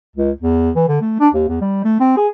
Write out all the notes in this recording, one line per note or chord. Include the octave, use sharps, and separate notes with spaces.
C#2
E2
E3
D3
A3
D4
D#2
E2
G3
A3
C4
G#4